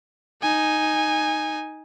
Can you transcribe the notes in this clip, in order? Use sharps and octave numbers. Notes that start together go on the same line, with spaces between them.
D#4 G#5